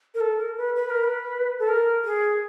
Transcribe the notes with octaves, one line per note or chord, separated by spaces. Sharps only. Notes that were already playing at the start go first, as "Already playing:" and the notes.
A#4
A4
A#4
B4
B4
A#4
B4
A4
A#4
G#4